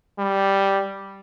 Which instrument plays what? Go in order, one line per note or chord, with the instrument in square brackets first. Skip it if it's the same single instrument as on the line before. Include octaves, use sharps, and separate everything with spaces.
[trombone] G3